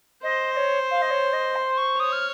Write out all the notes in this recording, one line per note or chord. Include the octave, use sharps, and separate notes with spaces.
C5 D#5
D#5
C#5
F5
D#5
C#5
D#5
C6
C#6
C#5 D#6
F6